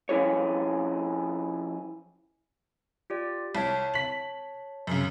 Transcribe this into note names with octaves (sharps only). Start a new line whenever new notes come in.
F3 C#4 E4 G#4 C#5
F4 G4 D5
C2 C#5 A5
B6 F#7
F#2 C#3